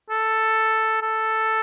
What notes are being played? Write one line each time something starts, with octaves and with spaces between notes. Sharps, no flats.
A4
A4